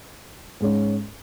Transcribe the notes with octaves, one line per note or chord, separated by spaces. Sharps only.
G#2 G#3 C#4